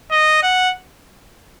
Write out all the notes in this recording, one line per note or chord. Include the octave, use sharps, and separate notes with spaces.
D#5
F#5